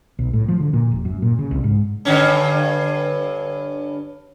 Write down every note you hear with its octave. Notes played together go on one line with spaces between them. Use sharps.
B1
A2
F3
D3
A#2
F1
F#2
A#2
C#3
C2
G#2
G2 D3 C#4